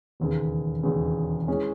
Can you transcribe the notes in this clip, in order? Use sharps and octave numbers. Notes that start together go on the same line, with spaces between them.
E1 D#2 C#3
E1 D#2 C#3
E3 G#3 C#4